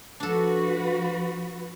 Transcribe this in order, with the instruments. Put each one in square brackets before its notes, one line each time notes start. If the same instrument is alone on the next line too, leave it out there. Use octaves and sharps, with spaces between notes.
[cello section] F3 F#4 B4 [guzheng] D4 A4